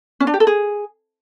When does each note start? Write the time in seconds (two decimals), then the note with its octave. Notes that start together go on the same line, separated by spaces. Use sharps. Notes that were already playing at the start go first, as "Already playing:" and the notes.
0.20 C#4
0.27 D4
0.34 G4
0.40 A4
0.47 G#4